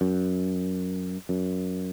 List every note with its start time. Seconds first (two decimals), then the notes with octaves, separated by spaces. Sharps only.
0.01 F#2
1.29 F#2